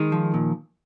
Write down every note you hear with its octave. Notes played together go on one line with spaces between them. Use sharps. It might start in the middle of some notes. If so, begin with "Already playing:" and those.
Already playing: D#3 G#3 D#4
F3
A#2